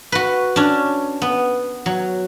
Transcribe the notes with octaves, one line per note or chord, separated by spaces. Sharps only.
F#4 B4
C#4 D4
B3
F#3